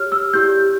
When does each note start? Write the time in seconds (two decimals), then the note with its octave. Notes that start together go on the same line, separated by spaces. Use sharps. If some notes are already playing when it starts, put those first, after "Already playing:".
Already playing: G4 C#5 F6
0.12 E6
0.33 E4 G4 D5 G6